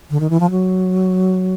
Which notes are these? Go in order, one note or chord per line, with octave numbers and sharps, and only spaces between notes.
D3
D#3
E3
F3
F#3